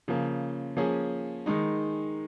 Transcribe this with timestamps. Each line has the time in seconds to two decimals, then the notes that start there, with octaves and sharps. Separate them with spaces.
0.08 C#3 F3 A#3
0.77 F3 A#3 C#4 G#4
1.46 D#3 G#3 D#4